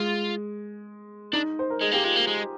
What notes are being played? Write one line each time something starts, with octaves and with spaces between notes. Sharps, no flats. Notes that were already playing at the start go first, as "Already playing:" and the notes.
Already playing: G#3 F4
D4 D#4
C5
A#4
G#3 G#4
A#3 G4
G#3 F4
A#3
G#3